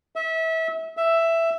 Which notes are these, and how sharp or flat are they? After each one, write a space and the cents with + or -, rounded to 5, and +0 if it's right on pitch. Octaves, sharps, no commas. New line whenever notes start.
E5 -30
E5 +5